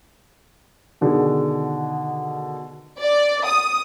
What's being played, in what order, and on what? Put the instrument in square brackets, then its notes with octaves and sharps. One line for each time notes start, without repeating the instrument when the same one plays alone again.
[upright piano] B2 D3 D#3 G#4
[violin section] D5
D#6